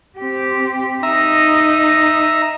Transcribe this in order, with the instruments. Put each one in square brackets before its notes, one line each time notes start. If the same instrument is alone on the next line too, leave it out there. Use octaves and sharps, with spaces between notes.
[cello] C4 G4
[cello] D#4 D#5 [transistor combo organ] E5 A#5